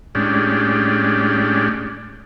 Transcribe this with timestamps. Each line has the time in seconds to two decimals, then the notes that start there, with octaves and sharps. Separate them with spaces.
0.15 A2 G#3 C#4 D4 G4